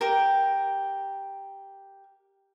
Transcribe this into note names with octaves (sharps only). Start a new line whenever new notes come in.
G4 A#4